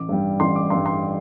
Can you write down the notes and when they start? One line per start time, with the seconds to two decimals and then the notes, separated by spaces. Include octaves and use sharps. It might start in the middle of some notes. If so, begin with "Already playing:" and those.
Already playing: A1 D6
0.09 G2 G3
0.40 A1 C6
0.56 D6
0.70 G2 G3 C6
0.86 C6